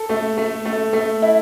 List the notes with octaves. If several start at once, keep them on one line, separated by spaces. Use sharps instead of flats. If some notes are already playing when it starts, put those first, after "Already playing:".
Already playing: A4
A3
A3
A3
A3
E4